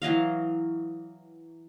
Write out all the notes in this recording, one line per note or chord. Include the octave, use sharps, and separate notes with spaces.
E3 F#3 D#5 F5